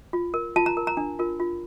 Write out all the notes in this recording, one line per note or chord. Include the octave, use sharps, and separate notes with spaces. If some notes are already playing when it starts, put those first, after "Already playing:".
F4
A#4
F4 A5
A#5
A#4
A#5
D4
F4 A#4
F4